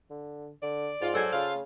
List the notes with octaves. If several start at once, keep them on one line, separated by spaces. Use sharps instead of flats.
D3
D3 D5
G#2 F4
F#3 A4 C5 G#5
C#3 F4 F5